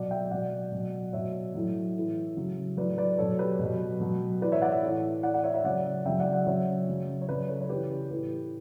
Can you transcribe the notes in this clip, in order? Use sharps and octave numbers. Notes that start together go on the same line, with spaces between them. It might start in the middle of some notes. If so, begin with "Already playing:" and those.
Already playing: B2 F#3 D5 F#5
E5 G5
B2 F#3 D5 F#5
B2 F#3
B2 F#3 C#5 E5
A2 F#3
A2 E3
C#3 F#3
A2 F#3 B4 D5
B4 D5
B2 F#3 A4 C#5
G4 B4
B2
F#3
B2 F#3
A2 E3 B4 D5
C#5 E5
D5 F#5
C#5 E5
A2 E3
A2 E3 D5 F#5
D5 F#5
C#5 E5
C#5 E5
C#3 F#3 D5 F#5
C#3 F#3 E5 G5
D5 F#5
D5 F#5
C#3 F#3 C#5 E5
C#3 F#3
C#5
C#3 F#3 B4 D5
A4 C#5
C#5
C#3 E3 G4 B4
A2 E3 G4 B4